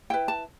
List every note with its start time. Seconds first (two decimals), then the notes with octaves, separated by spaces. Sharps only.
0.10 E4 B4 G5
0.28 A5